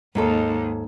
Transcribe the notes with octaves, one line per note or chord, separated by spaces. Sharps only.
D#2 G#2 D#4 A4